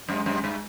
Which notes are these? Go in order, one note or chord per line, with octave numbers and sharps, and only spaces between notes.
F#2 G#3
F#2
G2